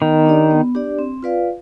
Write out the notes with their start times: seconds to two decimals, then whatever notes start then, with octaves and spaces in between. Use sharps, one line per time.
0.01 D#3 B3
0.26 D4 G4 D5
0.51 B3
0.75 D4 G4 D5
0.99 C4
1.23 F4 B4 D5 F5